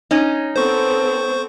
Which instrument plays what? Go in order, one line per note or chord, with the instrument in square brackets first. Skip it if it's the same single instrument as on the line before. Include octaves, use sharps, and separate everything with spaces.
[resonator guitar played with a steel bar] C#4 D#4
[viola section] B3 C4 A4 [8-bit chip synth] C5 C#6